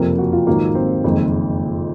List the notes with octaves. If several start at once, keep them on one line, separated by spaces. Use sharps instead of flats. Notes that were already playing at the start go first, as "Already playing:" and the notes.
Already playing: F#1 F2 C3 F3 A#4
F#4
F4
A#1 G#2 D#3 F#3 A#3
C4
F#1 F2 D#3 G#3